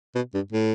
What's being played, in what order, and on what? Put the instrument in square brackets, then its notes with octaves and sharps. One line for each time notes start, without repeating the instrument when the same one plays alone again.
[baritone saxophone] B2
G2
A2